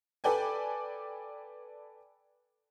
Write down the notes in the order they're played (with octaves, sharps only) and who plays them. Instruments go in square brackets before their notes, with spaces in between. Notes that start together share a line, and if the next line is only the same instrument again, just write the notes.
[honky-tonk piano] A4 B4 D5 G5 G#5